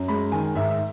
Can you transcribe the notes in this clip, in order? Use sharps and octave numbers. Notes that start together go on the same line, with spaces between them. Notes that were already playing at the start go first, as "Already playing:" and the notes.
Already playing: F#2
G#3 B5
D#3 G#5
G#2 E5
E5